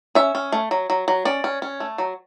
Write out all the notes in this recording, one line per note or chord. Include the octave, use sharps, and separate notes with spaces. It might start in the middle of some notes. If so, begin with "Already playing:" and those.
C#4 E5
C#4
A3
F#3
F#3
F#3
C#4 D5
C#4
C#4
A3
F#3